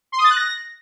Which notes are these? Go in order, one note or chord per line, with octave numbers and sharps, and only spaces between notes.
C6
D#6
A6
F#6
A#6